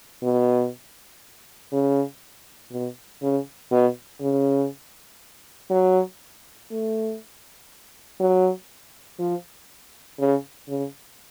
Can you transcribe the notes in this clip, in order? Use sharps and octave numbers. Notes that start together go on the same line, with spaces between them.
B2
C#3
B2
C#3
B2
C#3
F#3
A3
F#3
F3
C#3
C#3